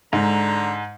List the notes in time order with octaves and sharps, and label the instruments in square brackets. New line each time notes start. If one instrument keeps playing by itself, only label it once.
[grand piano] G#2 [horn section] D3 A#5